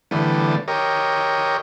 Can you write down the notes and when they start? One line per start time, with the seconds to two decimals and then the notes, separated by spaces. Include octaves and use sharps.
0.11 D3 E3 G3 A3 B3
0.68 G4 A#4 C#5 D#5